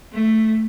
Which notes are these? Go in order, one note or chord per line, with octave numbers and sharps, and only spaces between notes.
A3